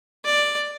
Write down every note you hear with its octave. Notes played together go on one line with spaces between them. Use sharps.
D5